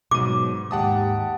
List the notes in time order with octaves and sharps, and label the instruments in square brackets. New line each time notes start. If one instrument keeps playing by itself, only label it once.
[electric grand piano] G#2 D#7 [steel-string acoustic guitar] B2 F#3 [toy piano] D6
[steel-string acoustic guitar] D#2 G#2 G4 [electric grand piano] F#5 A5 D#6